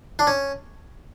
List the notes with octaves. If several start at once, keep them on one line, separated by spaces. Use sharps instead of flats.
D4
C#4